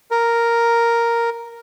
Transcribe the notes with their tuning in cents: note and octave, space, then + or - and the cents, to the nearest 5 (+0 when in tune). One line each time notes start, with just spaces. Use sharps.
A#4 +0